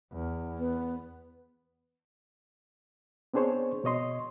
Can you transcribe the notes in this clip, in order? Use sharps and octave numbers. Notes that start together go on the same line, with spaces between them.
E2
B3
B3 C4 D4 G#4 C5 C#5
B2 C#5 D#5 C6